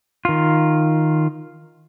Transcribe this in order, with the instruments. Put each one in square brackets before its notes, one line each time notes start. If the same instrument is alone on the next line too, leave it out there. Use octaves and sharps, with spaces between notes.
[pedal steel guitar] D#3 F4